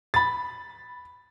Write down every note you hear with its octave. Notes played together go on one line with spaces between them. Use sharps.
B5 A6